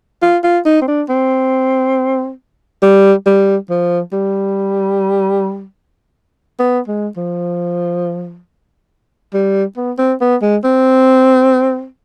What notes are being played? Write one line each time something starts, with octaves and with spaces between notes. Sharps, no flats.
F4
F4
D#4
C4
D4
C4
G3
G3
F3
G3
B3
G#3
F3
G3
B3
C4
B3
G#3
C4